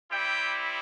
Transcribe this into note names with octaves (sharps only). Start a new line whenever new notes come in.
G3 C4 E4 G4 G5